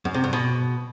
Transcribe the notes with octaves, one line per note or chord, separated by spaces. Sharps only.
F#2
C3
G2
B2